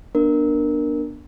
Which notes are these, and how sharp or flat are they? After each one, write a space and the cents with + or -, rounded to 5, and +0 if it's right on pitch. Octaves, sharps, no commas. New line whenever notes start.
B3 -20 D4 +15 A#4 +0